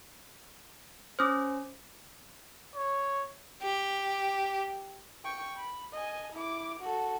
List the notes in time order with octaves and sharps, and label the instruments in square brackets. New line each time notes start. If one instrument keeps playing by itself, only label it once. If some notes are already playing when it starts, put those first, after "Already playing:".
[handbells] C#4 C5 [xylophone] D6 D#6 F6
[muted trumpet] C#5
[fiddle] G4
[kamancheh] G5 C#6
B5
D#5 G#5
E4 D6
F#4 A4